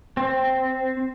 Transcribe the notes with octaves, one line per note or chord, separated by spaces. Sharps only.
C4